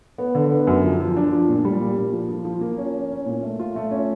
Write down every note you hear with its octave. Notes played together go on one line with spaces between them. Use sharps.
B3
D3
B3
F#2
F3
F3
D4
F3
A#2
G3
A#2
A#2
F3
F3
F3
A#3
C#4
C#4
C#4
A#2
A3
F4
A3
C#4